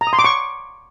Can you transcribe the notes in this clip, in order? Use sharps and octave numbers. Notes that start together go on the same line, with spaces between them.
A#5
D#6
C6
D6
C#6